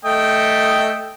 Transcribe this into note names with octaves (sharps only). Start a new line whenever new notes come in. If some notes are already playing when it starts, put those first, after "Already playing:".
A3 D#5 G5